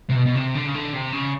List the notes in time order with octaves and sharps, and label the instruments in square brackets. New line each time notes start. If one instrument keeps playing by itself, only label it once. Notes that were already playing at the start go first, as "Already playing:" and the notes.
[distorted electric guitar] C3
B2
B2
C3
D3
C#3
D3
C3
C#3